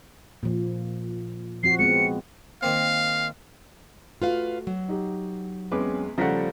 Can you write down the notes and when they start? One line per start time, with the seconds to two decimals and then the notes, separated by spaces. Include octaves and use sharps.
0.43 A#2 F3
1.63 F3 C4 F#4 C7
1.79 G#3 B3 C4 C#7
2.62 D#3 A#3 C4 F5
4.22 A3 F4 F#4 B4 F5
4.67 F#3
4.88 D#4 G4
5.72 E2 G#3 C4 C#4 B4 D6
6.18 C#3 F3 G3 A3 F#5 A#5 A#6 B6